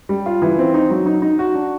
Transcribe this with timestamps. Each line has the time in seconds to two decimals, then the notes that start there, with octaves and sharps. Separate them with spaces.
0.09 G3
0.26 F4
0.42 E3
0.59 C4
0.74 D#4
0.90 F#3
1.06 D#4
1.22 D#4
1.39 F#4
1.55 D4